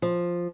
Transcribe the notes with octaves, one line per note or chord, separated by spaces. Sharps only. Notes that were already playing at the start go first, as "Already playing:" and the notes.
F3